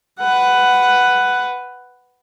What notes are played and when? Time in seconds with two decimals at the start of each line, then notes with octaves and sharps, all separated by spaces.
0.20 B4 F#5